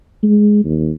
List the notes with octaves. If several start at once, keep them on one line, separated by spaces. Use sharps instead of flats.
G#3
D#2